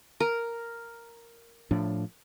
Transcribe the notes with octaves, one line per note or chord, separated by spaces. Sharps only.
A#4
A2 F3 D4